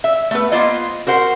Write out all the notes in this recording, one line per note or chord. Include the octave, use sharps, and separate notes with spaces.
E5
A3 B3 B4
A#3 B3 F4 C5 D#5
F#4 A#4 C5 F#5